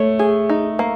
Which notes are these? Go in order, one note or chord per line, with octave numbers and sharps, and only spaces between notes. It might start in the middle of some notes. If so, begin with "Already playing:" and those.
Already playing: A3 C#5
G#4
D#4
A#3